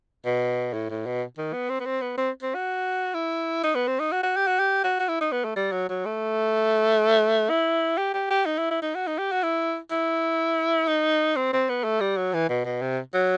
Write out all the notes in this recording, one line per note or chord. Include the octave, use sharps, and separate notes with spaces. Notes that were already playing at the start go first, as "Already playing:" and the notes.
B2
A2
A2
B2
D#3
B3
C4
B3
C4
B3
C4
C4
F#4
E4
D#4
B3
C4
D#4
F#4
F#4
G4
F#4
G4
F#4
F#4
E4
D#4
B3
A3
G3
F#3
F#3
A3
E4
G4
G4
G4
D#4
E4
E4
D#4
F#4
D#4
G4
F#4
E4
E4
D#4
C4
C4
B3
A3
G3
F#3
E3
B2
B2
C3
F#3